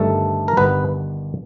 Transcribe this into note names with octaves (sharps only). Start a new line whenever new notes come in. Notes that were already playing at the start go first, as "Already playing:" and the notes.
Already playing: G1 G2 D#3 G3 A3 A4
A#4
G1 G2 D#3 G3 B3 B4